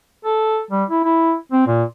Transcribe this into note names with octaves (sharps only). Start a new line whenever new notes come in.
A4
G3
E4
E4
C4
A#2